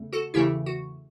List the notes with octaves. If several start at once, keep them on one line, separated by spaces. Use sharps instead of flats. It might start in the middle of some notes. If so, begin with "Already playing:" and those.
Already playing: E2 C#3 A3
F#4 A4
E2 C#3 E3 A3 E4 G4
F#4